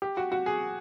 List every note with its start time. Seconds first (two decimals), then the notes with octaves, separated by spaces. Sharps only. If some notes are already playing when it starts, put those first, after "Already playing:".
0.02 G4
0.17 F#4
0.32 F#4
0.46 G#4